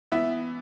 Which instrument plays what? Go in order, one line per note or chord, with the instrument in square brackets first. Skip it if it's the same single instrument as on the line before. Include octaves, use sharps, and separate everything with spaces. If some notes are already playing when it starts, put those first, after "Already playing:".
[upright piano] E3 B3 [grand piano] E5